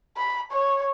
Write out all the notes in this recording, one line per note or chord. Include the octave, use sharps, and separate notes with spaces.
B5
C#5